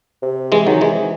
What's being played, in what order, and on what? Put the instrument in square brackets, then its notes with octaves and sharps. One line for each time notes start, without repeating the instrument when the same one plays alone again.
[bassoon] C3
[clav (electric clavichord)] E3 G#3
D#3 F#3
E3 G#3